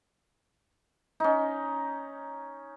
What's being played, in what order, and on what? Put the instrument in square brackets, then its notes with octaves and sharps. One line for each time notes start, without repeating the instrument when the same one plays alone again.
[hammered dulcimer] C#4 D#4